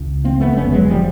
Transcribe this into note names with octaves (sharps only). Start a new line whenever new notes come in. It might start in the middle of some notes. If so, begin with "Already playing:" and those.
Already playing: C#2
A#3 C4
A3 B3
F1 D#2 D3 B3 C#4
F#3 G#3
F3 G3